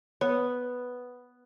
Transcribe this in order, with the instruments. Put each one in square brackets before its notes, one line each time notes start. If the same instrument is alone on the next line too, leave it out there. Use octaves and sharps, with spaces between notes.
[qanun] B3 [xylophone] C#5